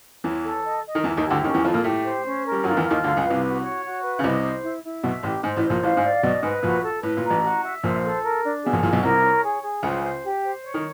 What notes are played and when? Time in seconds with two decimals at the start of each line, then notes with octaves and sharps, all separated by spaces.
0.24 E2 E3 C#5
0.43 A4
0.64 D#5
0.85 D#5
0.95 D#3
1.04 E2 E3 E4
1.17 D#2 D#3
1.24 G4
1.30 D2 D3
1.44 D#2 D#3 C#4
1.54 E2 E3
1.64 F2 F3 A4
1.74 A#2 A#3
1.84 A2 A3 G4
2.04 C5
2.24 C#4
2.44 A#4
2.52 G3
2.64 F#2 F#3 F4
2.71 D#3
2.77 E2 E3
2.84 F4
2.90 D#2 D#3
3.04 D2 D3 F5
3.17 C#2 C#3
3.23 B4
3.30 C2 C3
3.44 F#4
3.64 C#5
3.84 F#4
4.03 B4
4.19 C#3
4.23 C2 C3 D#5
4.43 C5
4.64 E4
4.84 E4
5.03 B1 B2 E5
5.23 A1 A2 G4
5.43 G#2 C5
5.56 A1 A2
5.64 C5
5.70 A#1 A#2
5.83 A1 A2 F5
5.97 G#2
6.04 D5
6.23 B1 B2 D#5
6.43 G#2 B4
6.63 A#1 A#2 F#4
6.83 A4
7.03 A2 B4
7.17 A#2
7.23 A#5
7.30 A1 A2
7.43 F#4
7.63 E5
7.83 A#1 A#2 C5
8.03 A4
8.23 A#4
8.43 D4
8.63 B2 G#4
8.73 A#1 A#2
8.83 A#1 A#2 E4
8.93 B1 B2
9.02 C2 C3 A#4
9.23 C#5
9.43 G#4
9.63 G#4
9.82 C#2 C#3 C5
10.02 C5
10.23 G4
10.43 C5
10.63 C#5
10.74 D#3